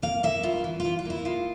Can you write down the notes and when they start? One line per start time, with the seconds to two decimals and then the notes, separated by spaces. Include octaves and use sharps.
0.02 A#3 F5
0.23 A#3 E5
0.43 G2 F4
0.64 E3
0.80 E3 F4
0.99 F4
1.05 A#3 E4
1.25 G#3 F4